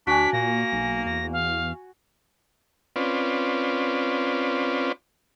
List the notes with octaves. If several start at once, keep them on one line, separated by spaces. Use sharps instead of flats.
D2 D4 F#4 G#5 B6
A#2 A#3 A#6
B1
E2 A#6
F5
C4 C#4 F4 B4 D5